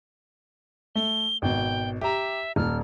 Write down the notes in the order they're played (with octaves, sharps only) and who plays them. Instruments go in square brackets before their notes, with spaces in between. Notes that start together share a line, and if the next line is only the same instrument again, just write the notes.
[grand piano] A3 [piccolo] G7
[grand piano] G#1 B2 [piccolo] G5
[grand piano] G4 A#5 [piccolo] E5
[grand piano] D#1 [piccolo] F6